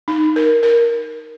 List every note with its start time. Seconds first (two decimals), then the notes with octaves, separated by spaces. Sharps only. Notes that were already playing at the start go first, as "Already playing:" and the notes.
0.08 D#4
0.36 A#4
0.63 A#4